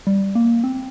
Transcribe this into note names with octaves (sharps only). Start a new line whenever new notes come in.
G3
A#3
C4